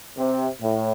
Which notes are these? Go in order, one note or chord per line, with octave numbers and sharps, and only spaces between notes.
C3
A2